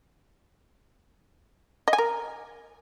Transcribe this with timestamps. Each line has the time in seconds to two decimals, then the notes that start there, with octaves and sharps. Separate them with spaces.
1.88 D#5
1.93 G#5
1.98 A#4